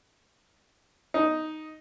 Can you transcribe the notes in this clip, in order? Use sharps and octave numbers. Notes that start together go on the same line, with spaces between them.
D#4